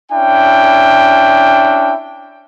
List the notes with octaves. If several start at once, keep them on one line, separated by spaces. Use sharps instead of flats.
C#4 D4 E4 G5